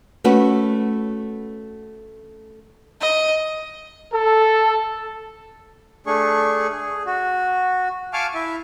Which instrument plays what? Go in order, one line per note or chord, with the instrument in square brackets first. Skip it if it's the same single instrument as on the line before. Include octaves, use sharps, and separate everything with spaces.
[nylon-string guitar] A3 C#4 F#4 B4
[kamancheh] D#5
[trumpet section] A4
[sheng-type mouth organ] A3 D4 G#4 C#6
G#4
F#4
F5 G#5 A5 C#6 D6 F6
E4 E5